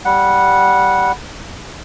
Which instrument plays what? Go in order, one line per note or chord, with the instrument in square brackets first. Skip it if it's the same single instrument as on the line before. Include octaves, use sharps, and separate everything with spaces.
[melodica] G3 F#5